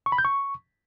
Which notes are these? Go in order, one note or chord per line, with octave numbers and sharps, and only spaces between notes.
C#6
B5
G6
C#6